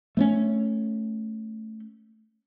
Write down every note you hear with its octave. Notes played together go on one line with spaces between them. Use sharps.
A3 B3 C#4